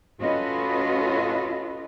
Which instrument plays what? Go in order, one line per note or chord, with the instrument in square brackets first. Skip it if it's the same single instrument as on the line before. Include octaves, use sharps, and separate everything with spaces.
[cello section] C#4 F4 F#4 A4 B4 D#5